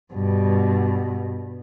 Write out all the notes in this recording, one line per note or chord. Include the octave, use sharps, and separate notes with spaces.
G2 B2